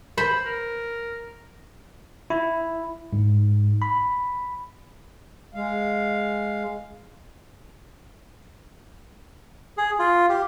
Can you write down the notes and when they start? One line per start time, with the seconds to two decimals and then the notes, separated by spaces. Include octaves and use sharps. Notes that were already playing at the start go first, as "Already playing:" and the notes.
0.17 C5 B5
0.46 A#4
2.30 E4
3.13 G#2
3.82 B5
5.54 G#3 F5
9.77 G#4
9.99 F4
10.29 G4